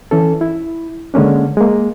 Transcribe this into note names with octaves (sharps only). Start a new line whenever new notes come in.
E3 C#4 A4
E4
D3 G#3 A#3 C#4 D4
G#3 A#3